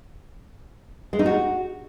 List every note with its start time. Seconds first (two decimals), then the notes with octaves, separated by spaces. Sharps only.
1.13 G#3
1.19 D#4
1.26 F#4